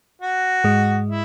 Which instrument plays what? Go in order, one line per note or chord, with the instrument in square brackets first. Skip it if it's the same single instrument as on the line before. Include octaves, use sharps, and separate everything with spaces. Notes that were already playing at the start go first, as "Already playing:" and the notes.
[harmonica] F#4
[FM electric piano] G#2 G#3
[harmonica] E4